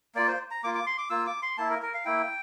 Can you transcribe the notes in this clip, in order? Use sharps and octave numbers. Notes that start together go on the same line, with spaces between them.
A#3 F4 D5
C5
A#5
A#3 F4 D6
D6
C6
D6
A#3 F4 E6
D6
C6
A#3 E4 A5
A#4
A#4
F5
A#3 E4 G5